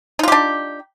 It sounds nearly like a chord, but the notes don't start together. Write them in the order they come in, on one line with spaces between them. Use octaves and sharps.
D#4 F4 G4 D4